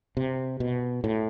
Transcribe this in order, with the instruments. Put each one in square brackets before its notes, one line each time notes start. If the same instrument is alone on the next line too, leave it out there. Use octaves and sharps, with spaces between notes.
[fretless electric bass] C3
B2
A2